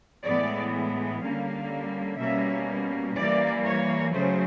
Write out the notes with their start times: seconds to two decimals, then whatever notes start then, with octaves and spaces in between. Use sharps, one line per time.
0.24 A2 E3 G#3 B3 D5
1.22 D3 G3 A#3 C#4 F5
2.18 B2 G3 A#3 C#4 E5
3.15 E3 G3 A#3 D5
3.65 C#5
4.13 C#3 F#3 A3 C#4 C5